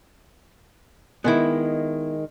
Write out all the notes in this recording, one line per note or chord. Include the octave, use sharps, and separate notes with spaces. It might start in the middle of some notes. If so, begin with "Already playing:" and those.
D#3 G#3 B3 E4